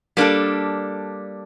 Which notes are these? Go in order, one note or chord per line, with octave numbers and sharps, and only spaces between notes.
G3 A#3 D4 A4